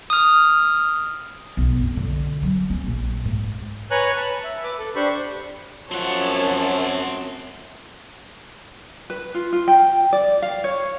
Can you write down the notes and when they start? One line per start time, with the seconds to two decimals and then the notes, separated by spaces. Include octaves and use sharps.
0.10 D#6 F6
1.57 B1
1.82 F2
1.97 D3
2.43 F#3
2.70 C#4
2.86 A#1
3.25 G#2
3.91 B4 C#5 G#5 A#5 C#6 F#6
4.17 A5 B5
4.44 E5
4.64 B4 D6
4.79 A4
4.95 D4 G4 C5 B5 C#6
5.91 F#2 F3 C4 C#5 F#5 A5
9.10 B4
9.35 F4
9.52 F4
9.68 G5
10.13 D5
10.42 F5
10.64 C#5